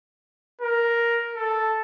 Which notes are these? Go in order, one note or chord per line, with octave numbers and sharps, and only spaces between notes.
A#4
A4